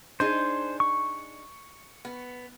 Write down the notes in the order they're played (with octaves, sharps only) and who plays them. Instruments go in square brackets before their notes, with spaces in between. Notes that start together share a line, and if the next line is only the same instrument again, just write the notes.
[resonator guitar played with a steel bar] D4 D#4 G#4 [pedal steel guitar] C5
[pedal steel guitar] C#6
[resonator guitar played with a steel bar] B3